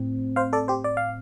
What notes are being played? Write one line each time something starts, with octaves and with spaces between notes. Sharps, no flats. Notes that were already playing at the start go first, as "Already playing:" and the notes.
Already playing: A2 C4
C5 F5
A4 D5
G4 C5
D5
F5